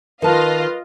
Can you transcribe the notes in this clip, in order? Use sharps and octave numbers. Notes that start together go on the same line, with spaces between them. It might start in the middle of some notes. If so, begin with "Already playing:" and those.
D#3 F4 B4 D#5 F5 A5